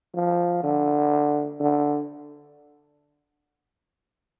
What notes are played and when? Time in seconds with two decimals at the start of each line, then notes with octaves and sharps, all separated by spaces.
0.15 F3
0.63 D3
1.60 D3